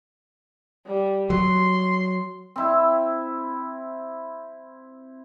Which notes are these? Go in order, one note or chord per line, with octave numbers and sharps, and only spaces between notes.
G3
F#3 C6
C4 E4